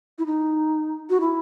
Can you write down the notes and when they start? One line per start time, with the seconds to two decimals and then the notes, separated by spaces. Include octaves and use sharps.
0.18 E4
0.26 D#4
1.10 F#4
1.21 E4